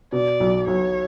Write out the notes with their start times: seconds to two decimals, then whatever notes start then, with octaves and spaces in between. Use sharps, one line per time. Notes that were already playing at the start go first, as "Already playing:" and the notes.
0.12 B2 D5
0.40 B1
0.68 B1 C#5